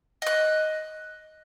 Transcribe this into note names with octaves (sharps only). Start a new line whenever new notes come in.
D#5 F#6